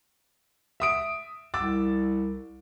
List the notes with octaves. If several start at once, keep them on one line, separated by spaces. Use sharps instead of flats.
E5 D#6 D7
C2 D6 E6 A6